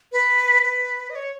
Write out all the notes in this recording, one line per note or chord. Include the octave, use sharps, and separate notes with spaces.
B4
B4
D#5
C#5